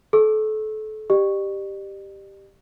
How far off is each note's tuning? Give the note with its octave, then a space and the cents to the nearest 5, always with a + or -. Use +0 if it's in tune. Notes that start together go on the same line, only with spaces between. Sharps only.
A4 -30 C#6 -30 E6 +0
G4 +0 D5 +40